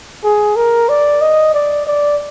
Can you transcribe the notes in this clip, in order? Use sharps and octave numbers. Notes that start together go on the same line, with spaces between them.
G#4
A#4
D5
D#5
D5
D5